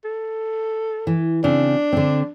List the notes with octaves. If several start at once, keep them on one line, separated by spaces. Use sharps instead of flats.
A4
E3
C#3 C4 D4
D3 C4